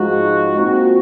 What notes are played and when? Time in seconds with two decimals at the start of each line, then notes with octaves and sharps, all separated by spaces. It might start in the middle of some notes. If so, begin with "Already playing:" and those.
Already playing: G#2 F3 G#3 D#4 F#4
0.58 A#2 F3 C4 F#4